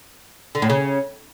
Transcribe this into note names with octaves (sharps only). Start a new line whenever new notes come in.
D3
A2
C#3